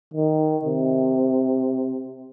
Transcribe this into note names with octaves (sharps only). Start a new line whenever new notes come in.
D#3
C3